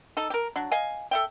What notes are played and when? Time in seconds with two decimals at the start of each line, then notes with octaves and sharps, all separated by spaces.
0.17 D#4 A4
0.30 G4 A#4
0.56 F#3 D4
0.72 D#5 F5 G#5
1.11 A4 E5 G5